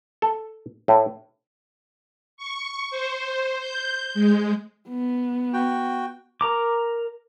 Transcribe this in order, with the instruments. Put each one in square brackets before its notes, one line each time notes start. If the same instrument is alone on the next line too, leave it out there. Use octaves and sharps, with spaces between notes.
[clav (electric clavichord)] A4
A2
[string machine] C#6
C5
G6
G#3
[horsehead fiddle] B3
[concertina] F#4 G5
[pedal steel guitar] A#4 A#5 D6